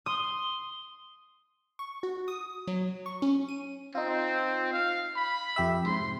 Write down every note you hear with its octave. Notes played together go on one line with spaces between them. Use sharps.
C6 D#6
C#6
F#4
D#6
F#3
C#6
C#4
D#7
C4 D#4 F4
F5
B5
F2 G4 E5
G#2 C3 C6